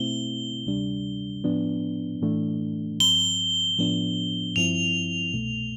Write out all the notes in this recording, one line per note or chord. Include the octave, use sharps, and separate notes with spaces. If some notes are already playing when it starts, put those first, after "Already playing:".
Already playing: B2 A3 C4 E4 G7
D2 C3 G3 D4
A2 F3 B3 D4
A2 E3 A3 D4
G2 F3 C4 G7
A2 F3 B3 D4
G2 F3 C4 E4 F7
C2 B2 A3